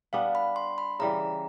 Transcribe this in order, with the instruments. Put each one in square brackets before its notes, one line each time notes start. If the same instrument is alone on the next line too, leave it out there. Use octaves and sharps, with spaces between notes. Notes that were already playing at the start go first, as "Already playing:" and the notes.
[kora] G3 B3 D4 [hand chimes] F5
[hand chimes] B5
C6
B5
[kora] C#3 E3 G3 [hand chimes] A#5